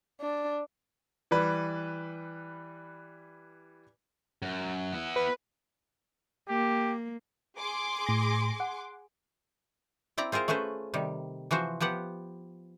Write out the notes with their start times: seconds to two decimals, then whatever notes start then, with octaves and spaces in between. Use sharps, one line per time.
0.20 D4
1.31 E3 G3 B4
4.42 F#2
4.93 B3 E4
5.16 B4
6.49 A#3 G4
7.58 G#4 C6 D6
8.06 A2 A#6
8.60 F#5
10.18 C4 E4 D5 A#5
10.32 C4 F4 G#4 A#4 C5
10.48 A3 C#4 G#4 B4 C5
10.94 C3 D#3 G3
11.51 E3 F3 F#4 C5
11.81 F3 B3 G4 F#5